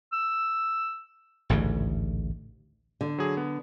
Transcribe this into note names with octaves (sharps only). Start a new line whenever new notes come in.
E6
A1 D2 G#2 C#3
D3
F#3 G#4
B3